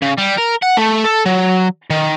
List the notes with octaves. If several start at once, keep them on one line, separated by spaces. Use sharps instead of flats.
C#3
G3
A#4
F#5
A3
A4
F#3
D#3